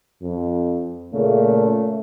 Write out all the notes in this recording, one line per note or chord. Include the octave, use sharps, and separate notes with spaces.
F2
A#2 C#3 A3